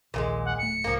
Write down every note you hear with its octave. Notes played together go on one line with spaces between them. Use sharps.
A#1 D#2 A#2 F3 G#3
F#5
D1 A3 C#7
C2 G#2 F3 A#3